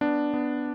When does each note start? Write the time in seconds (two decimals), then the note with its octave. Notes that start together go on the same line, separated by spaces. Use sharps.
0.01 B3 D4
0.34 B3